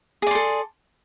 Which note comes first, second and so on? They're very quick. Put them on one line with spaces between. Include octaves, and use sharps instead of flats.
G#4 D5 C6 A4